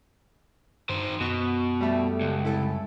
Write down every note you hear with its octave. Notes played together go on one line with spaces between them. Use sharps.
G2 D#3 C5
F#2 B2 F#4 D#5 C#6
G3 A3
C#2
C2 E4 A4